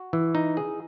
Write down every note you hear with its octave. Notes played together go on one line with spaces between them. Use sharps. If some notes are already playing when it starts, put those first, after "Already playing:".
Already playing: F#4
E3
D#4
G#4